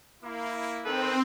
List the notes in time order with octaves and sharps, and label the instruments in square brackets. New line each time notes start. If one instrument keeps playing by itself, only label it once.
[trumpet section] A#3 E4
[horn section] D#3 A4 B4 [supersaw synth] C4